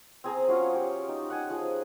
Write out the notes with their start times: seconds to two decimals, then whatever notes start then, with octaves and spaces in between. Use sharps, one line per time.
0.24 C4 G#4 A#5
0.48 F#3 C#4 F4
0.74 G4
1.09 D#4
1.30 F#5 G#5
1.50 F3 G#4